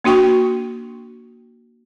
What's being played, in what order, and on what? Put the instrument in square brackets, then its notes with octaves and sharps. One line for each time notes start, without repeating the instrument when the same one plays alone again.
[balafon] A#3 D4 F#4 G5 C#6